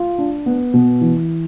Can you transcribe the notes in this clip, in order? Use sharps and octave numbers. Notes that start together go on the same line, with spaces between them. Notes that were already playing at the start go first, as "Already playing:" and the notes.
Already playing: F4
D4
B3
B2
E3